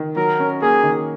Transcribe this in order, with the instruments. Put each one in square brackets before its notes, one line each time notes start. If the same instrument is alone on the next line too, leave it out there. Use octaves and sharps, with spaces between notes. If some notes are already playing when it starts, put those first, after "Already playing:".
Already playing: [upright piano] D#3
[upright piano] F#3 [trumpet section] A#4
[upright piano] C#4
[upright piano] A#3 [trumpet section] G#4
[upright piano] D#3